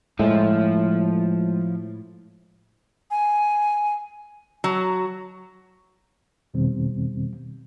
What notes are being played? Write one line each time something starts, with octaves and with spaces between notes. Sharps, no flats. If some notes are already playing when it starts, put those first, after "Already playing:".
A2 F3 G#3 E5
G#5
F#3
E2 B2 D#3 G3 C4